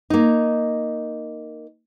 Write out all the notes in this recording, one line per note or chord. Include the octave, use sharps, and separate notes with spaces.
A#3 D#4